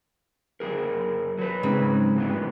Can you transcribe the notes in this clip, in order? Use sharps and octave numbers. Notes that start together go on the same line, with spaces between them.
F#2 G#4 A#4
F#3 B4
G#2 C#3 C4
F2 C3 B3